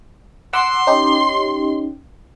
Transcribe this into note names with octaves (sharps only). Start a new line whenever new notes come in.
F#5 C6 D6 E6
C#4 D#4 G4